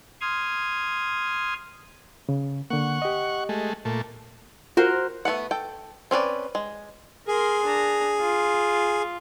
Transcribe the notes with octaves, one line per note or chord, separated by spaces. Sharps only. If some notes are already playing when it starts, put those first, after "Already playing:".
C6 D#6 F6 G#6
C#3
D3 A#3 F#5 C#6
G4 D#5
G#3 A3
A#2 A3
F4 F#4 A#4 C5
A3 B3 B4 F#5
A4 G5
C4 C#4 B4 D5
G#3
G#4 A#4 C6
D4 A#5
F4